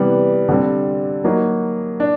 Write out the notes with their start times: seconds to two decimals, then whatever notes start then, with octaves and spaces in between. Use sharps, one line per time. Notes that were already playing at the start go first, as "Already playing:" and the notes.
Already playing: C3 E3 G3 B3
0.49 D3 G3 C4
1.24 F#3 A#3 D#4
2.00 D4